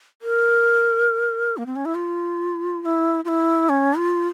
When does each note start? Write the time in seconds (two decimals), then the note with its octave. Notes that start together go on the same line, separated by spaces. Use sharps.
0.22 A#4
1.57 A#3
1.66 C4
1.76 C#4
1.85 E4
1.95 F4
2.82 F4
2.85 E4
3.25 F4
3.28 E4
3.69 C#4
3.97 F4